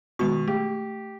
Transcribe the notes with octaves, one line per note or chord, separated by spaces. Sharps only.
B2 D#3 G#3 C#6
A3 G4